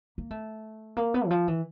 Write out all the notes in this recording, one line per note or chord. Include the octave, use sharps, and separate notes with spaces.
A#3
A3
A#3
B3
E3
F3
E3